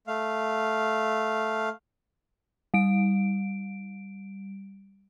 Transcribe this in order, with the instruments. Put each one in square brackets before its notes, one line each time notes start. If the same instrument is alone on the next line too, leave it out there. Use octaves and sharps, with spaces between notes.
[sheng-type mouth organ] A3 F5
[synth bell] G3 D7